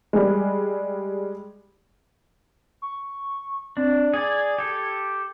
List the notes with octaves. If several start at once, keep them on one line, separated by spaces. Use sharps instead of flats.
G3 G#3
C#6
C4 D4
G#4 D5 G#6
G4 A4